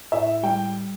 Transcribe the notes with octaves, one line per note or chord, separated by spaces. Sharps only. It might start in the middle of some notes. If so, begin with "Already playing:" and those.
A2 E5
G3 G5